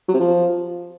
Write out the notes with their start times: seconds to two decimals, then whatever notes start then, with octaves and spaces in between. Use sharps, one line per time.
0.08 F#3
0.14 C3
0.20 F3